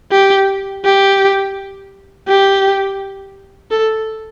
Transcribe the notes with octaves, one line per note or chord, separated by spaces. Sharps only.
G4
G4
G4
A4